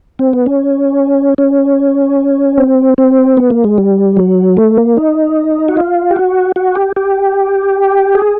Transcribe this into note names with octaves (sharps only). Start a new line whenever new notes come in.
C4
B3
C#4
C#4
C4
C4
B3
A#3
G#3
G3
F#3
A3
A#3
D#4
F#4
F4
G4
F#4
F#4
G4
G4
G#4